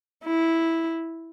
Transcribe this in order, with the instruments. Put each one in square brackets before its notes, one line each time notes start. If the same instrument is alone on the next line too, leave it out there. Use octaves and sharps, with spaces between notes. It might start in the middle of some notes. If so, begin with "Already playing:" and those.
[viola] E4